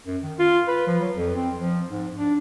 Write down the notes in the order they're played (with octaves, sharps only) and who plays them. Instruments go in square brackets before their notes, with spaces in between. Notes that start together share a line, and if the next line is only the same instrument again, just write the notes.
[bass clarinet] F#2
D#3
F4
B4
F3
F#3
F2
C4
F3
G#2
D4